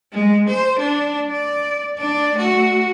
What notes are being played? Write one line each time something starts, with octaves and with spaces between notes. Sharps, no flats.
G#3
C5
D4
D5
D4 D5
A3 F#4